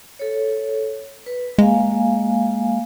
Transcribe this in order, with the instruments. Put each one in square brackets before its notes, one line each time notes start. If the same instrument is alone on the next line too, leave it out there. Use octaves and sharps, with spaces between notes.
[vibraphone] A4 C#5
B4
[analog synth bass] G#3 [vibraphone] A#3 F5 G#5